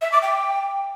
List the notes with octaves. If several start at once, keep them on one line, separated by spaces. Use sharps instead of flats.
E5
D6
G5